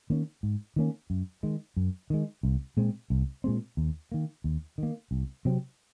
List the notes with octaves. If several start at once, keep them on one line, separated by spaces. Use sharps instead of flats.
D#3 A#3 C#4
G#2
D#3 A#3 C#4
F#2
D#3 G#3
F#2
D#3 G#3
C2
A#2 G#3 C4
C2
A#2 G#3 C4
D#2
D#3 A#3
D#2
D#3 A#3
C2
C3 F#3 C4